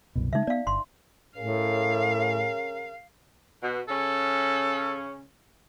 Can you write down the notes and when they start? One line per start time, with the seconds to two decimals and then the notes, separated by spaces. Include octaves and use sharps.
0.15 C2 F#2 B2
0.33 C#3 E3 G#3 D#4 E5
0.47 B3 D5 F5
0.67 G1 C6
1.37 A2 C#4 G#4 A#4 F5
3.61 B2
3.88 C#3 C#4 A4